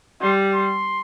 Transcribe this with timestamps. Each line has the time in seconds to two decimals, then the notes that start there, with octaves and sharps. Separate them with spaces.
0.21 G3 C6
0.54 C6